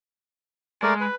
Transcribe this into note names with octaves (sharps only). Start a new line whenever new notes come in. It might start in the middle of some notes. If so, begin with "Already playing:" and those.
G#3 A3 A#4 D5
B4